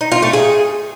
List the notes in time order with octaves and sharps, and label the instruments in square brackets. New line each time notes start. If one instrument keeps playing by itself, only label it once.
[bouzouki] D#4
F4
A3
G#4